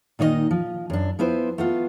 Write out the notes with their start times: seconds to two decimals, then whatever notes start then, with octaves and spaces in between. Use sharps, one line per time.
0.19 A#2 D#3 D#4 C#5 D#5
0.51 F3
0.90 F#2 D4
1.19 F3 B3 E4 B4 C5
1.58 A3 B3 F4